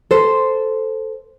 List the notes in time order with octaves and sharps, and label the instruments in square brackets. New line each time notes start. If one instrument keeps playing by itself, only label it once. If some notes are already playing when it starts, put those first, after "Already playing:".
[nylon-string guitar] A4 C5